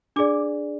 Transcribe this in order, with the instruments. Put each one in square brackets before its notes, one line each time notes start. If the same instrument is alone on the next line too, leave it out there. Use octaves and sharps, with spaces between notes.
[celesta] D4 G#4 D5 D6